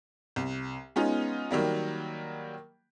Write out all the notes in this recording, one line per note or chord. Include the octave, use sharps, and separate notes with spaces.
C2
G#3 B3 C#4 D#4 F4
D#3 F#3 G3 A#3